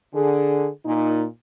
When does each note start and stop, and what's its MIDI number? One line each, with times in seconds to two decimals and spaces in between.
0.13 0.68 50
0.13 0.68 68
0.85 1.25 46
0.85 1.25 63